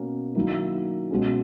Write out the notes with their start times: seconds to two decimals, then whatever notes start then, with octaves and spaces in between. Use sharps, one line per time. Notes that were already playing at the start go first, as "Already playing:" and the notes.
Already playing: B2 A#3 C#4
0.35 D#3 F#3 A#3 E4
1.10 B2 G#3 C#4